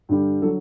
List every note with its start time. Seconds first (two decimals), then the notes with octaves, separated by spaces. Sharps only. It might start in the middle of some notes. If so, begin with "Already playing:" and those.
0.09 G2 D3 G3
0.42 D3 F#3 A4